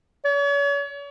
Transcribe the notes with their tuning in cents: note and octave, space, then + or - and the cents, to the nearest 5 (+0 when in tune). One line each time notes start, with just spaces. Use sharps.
C#5 +40